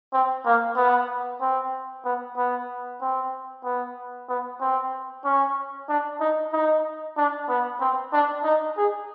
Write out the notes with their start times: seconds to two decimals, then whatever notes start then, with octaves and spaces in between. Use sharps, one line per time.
0.13 C4
0.45 A#3
0.76 B3
1.41 C4
2.05 B3
2.37 B3
3.01 C4
3.64 B3
4.29 B3
4.60 C4
5.24 C#4
5.89 D4
6.20 D#4
6.53 D#4
7.17 D4
7.49 B3
7.80 C4
8.13 D4
8.44 D#4
8.77 G#4